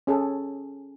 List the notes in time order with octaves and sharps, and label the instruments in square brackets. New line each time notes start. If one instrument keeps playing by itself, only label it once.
[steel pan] C#4 G#4 A4